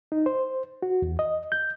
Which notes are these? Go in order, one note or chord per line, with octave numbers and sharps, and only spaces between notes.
D#4
C5
F#4
E2
D#5
G6